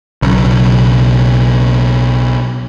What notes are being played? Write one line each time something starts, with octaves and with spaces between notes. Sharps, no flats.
B1 C#3